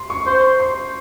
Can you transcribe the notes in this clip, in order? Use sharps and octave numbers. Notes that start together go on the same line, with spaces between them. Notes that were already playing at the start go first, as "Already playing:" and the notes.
Already playing: C6
C#6
C5 C#6
C6